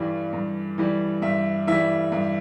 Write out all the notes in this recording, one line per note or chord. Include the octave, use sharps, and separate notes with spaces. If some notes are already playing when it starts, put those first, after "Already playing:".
Already playing: G2 E3 G3
G2
E3 G3
G2 E5
E3 G3 E5
G2